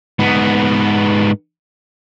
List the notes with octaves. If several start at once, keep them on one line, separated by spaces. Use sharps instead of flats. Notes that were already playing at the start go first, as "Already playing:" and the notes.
G#2 B3